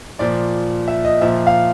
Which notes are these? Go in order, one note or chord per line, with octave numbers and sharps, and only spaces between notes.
A#2 F3 D5
E5
D#5
A#2 F3 E5
F5